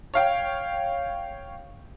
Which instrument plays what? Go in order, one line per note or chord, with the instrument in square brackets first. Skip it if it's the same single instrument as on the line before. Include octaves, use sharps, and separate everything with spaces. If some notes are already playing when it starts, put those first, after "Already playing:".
[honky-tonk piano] C#5 F5 G5